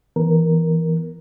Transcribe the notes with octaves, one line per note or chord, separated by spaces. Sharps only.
E3 B3 A#4